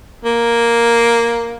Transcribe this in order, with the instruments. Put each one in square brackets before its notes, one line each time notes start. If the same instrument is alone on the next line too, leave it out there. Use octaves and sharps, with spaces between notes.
[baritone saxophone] A#3